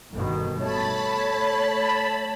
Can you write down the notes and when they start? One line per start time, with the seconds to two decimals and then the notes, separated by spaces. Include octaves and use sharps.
0.12 G1 B2 D#3
0.59 A3 C#5 A5 B5